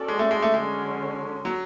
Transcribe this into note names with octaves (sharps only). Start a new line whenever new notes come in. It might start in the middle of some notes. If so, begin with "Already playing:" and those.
Already playing: C#4 F#4 A4 D5
G#3
A3
G#3
A3
D3 F#3 G#3 C#4
F#3